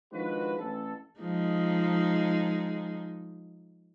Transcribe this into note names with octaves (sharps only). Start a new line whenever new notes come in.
D#3 F3 G#3 D4 F#4 B4
A1 A4
F3 G#3 D#4